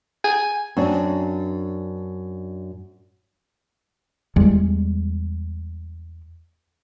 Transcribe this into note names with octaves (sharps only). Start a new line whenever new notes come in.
G#5
F#2 C4 D4
E2 G3 G#3